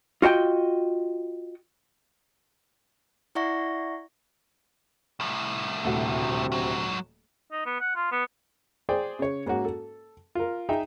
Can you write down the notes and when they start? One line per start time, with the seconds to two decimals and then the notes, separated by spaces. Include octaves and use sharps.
0.22 F4 F#4 D#5 G5
3.35 E4 D5 E5 F#5 C#6 A#6
5.20 C2 A2
5.84 D#1 D2 C3 A3 F#4
6.52 G#2 F#3
7.52 D#4
7.66 B3
7.80 F#5
7.96 F4
8.12 B3
8.89 G#4 C5 D5 G5
9.19 C#3 C#5
9.46 G#2 A#3 C#4 F#4
9.65 A4
10.35 F4 A#4
10.69 D#4 G#4 E5 G5